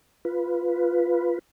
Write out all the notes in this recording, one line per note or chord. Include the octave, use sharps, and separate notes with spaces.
F4 B4